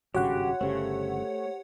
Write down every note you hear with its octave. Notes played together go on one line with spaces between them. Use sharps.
G#1 G2 C#3 F#4 G4 C#5 F#5
G1 C#3 A3 G4 C5